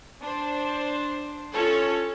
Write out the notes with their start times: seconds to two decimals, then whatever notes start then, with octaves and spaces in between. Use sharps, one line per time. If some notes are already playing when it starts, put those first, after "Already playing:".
0.22 D4 C5
1.54 C#4 F4 A4 C#5